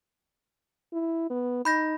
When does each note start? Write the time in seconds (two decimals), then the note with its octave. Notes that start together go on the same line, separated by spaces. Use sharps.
0.93 E4
1.30 B3
1.65 D#4 B5 G6 A#6